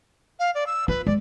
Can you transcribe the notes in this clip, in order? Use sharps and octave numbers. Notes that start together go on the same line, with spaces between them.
F5
D5
E6
F4 B4
G#3 D5